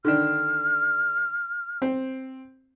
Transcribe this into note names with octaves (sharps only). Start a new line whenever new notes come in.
D3 D#3 D4 F6
C4